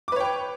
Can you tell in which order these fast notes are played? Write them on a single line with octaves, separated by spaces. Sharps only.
D6 B4 C#5 G5